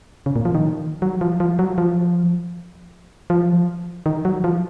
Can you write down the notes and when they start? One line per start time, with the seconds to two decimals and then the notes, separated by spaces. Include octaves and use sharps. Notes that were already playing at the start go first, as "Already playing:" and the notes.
0.26 C#3
0.36 A#2
0.45 F3
0.55 D#3
1.02 F#3
1.21 F3
1.40 F3
1.59 F#3
1.78 F3
3.30 F3
4.06 D#3
4.25 F#3
4.44 F3